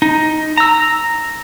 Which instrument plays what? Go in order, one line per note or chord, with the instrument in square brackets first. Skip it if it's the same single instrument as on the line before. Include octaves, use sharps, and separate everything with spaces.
[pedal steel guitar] D#4
A#5 E6